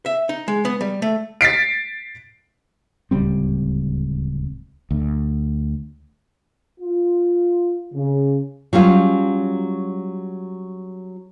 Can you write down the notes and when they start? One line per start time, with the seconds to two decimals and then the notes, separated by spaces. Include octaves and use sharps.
0.06 E5
0.29 D#4
0.48 G#3
0.65 B3
0.81 G3
1.02 A3
1.41 A6 B6 C7 D7
3.11 D1 C#2 G3 C4
4.91 D2
6.80 F4
7.93 C#3
8.73 F#3 G3 C#4 F4